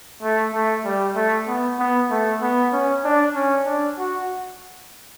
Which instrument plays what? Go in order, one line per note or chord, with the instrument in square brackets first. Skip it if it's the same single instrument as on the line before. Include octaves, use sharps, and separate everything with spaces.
[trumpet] A3
A3
G3
A3
B3
B3
A3
B3
C#4
D4
C#4
D4
F#4